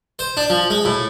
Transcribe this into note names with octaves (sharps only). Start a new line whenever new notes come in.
C5
D4
F3
G#3
A2